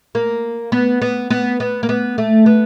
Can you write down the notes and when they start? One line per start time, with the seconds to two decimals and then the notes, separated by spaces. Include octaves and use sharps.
0.15 A#3
0.72 B3
1.02 B3
1.30 B3
1.60 B3
1.83 A#3
1.89 B3
2.18 A3
2.46 B3